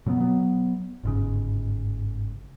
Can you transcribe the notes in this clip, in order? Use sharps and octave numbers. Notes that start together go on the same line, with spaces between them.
B2 F#3 A3 B3
F#3 B3
G1 G#2 C#3